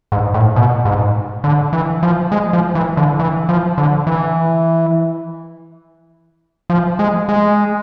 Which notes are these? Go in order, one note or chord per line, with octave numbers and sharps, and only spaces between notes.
G#2
A2
B2
G#2
D3
E3
F3
G#3
F3
E3
D3
E3
F3
D3
E3
F3
G#3
G#3